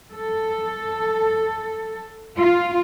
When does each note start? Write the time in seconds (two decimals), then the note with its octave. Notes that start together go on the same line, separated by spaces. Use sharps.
0.13 A4
2.38 F4